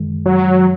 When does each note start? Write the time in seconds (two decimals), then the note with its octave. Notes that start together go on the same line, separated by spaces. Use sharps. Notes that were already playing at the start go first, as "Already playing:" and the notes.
Already playing: F#2 D#3 G#3
0.26 F#3